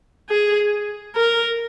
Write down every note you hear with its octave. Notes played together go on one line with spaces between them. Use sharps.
G#4
A#4